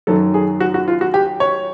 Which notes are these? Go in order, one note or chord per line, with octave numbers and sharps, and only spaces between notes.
F#2 D#3 F#3 A4
G#4
F#4
F#4
F4
F#4
G4
C#5